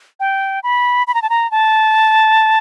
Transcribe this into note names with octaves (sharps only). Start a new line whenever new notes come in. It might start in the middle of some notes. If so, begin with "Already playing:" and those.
G5
B5
B5
A#5
A5
A#5
A5